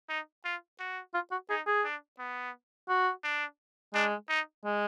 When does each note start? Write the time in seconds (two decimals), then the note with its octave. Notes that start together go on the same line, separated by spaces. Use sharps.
0.09 D#4
0.45 F4
0.80 F#4
1.14 F4
1.31 F#4
1.50 D#4 G#4
1.67 G#4
1.85 D4
2.19 B3
2.89 F#4
3.24 D4
3.94 G#3 D4
4.29 D#4
4.65 G#3